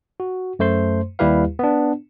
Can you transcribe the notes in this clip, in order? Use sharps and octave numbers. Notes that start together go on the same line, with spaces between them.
F#4
F#2 A3 C5 C6
D#2 G3 E4 G4 B4 F5
B3 D4